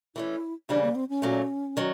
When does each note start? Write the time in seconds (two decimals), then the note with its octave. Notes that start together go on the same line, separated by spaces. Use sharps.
0.16 E3 A3 C#4 E4
0.69 D#2 C#3 E3 G3 D4
0.82 A#3
0.95 C4
1.09 C#4
1.22 A#2 F#3 A3
1.77 D#3 F#3